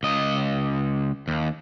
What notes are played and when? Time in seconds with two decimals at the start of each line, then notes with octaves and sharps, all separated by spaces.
0.03 C#2 D#5
1.28 D#2